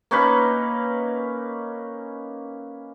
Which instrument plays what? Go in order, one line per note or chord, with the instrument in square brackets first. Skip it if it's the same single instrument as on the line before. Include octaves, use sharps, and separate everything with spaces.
[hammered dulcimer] A#3 C#4 D#4 B4